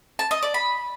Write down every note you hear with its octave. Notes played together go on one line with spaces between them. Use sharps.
A5
D#5
D5
B5